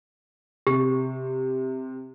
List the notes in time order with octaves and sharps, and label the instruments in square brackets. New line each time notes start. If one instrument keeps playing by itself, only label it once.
[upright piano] C3 [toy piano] G4